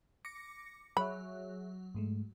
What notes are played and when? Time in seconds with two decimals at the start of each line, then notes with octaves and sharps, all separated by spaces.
0.25 D6 A#6 C#7
0.97 F#3 G#4 C#5 E5 B5
1.95 G#2 G#3 A3